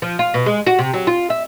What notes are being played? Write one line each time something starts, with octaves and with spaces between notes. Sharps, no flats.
F3
F4
B2
G#3
F#4
C3
F#3
F4
E5